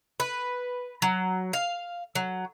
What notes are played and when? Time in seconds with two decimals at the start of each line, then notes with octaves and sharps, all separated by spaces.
0.20 B4
1.02 F#3
1.53 F5
2.15 F#3